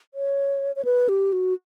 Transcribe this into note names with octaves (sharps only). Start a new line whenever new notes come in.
C#5
C#5
B4
G4
F#4